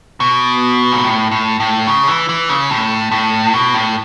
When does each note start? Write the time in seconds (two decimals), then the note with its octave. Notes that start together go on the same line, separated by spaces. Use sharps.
0.20 B2
0.92 G#2
1.04 A2
1.31 A2
1.60 A2
1.87 C#3
2.08 E3
2.29 E3
2.49 C#3
2.70 A2
3.11 A2
3.54 B2
3.74 A2